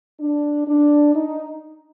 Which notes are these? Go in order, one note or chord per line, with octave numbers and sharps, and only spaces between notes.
D4
D4
D#4